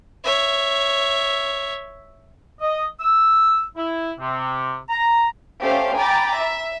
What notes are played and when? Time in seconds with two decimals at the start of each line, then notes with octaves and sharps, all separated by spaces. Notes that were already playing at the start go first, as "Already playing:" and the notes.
0.24 C#5 E5
2.61 D#5
3.00 E6
3.77 E4
4.19 C3
4.89 A#5
5.62 A3 C#4 G4 C5 F5
5.97 G5 G#5 A#5 B5 D6 A6
6.38 E5